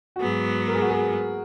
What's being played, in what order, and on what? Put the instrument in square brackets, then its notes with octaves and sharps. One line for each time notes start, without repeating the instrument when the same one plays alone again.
[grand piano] F#4
[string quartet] G#2 F#3 B3 [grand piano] G#4
[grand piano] A#4
G#4
F#4
G#4